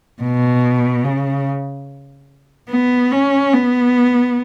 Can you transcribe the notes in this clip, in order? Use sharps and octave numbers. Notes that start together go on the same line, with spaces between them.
B2
C#3
B3
C#4
B3